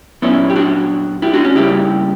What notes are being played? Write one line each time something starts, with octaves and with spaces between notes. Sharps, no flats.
A#2 F#3 B3 C#4 E4
G4
D4 F#4
E4 G4
D4 F#4
C#4
C#3 G3 A#3 E4 G4